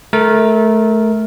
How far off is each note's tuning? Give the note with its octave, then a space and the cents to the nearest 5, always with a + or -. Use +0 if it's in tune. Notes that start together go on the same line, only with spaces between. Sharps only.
A3 -20 A#4 +0